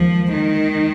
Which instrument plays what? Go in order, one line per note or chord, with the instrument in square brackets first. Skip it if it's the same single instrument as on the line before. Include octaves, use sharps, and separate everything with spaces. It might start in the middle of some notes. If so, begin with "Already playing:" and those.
Already playing: [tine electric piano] D#2 D#3 G#3 [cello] F3
[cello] D#3